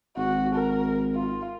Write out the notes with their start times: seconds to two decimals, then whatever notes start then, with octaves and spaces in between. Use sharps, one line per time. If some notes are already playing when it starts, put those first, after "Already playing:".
0.17 G#1 F#4
0.55 A#4
1.15 F4